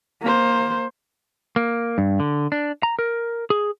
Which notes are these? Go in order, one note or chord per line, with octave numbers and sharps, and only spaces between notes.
A#3 C5
A#3
G2
D3
D4
A#5
A#4
G#4